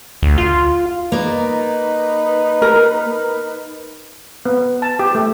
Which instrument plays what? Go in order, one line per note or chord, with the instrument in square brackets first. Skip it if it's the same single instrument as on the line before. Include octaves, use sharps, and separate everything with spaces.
[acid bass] D2
F4
[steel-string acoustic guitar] A#3 D5 [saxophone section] D#4 B4
[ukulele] A#4
[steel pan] B3
A5
G4
A3